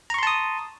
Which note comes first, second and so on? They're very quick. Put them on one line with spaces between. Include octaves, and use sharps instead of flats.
A#5 C#6 C6 A5 D#6